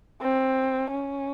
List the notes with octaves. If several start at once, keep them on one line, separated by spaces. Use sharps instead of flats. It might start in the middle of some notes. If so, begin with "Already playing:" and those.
C4
C#4